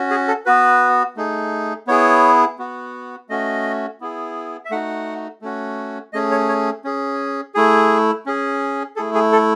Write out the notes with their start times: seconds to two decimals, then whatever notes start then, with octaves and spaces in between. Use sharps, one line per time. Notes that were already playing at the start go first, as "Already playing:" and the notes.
Already playing: C#4 F#4
0.10 G#4
0.28 A4
0.46 B3 F#4 B4
1.17 A3 D#4 G#4
1.87 B3 E4 G#4 C#5
2.59 B3 F#4
3.29 A3 C#4 F#4 D#5
4.01 B3 E4 G#4
4.65 E5
4.71 A3 D#4 F#4 F#5
5.42 A3 C#4 F#4
6.13 A3 C#4 G#4 D#5
6.31 C#5
6.49 C#5
6.84 C#4 G#4
7.55 A3 E4 G#4
8.26 C#4 G#4
8.96 A3 E4 G#4 A4
9.15 G#4
9.32 A4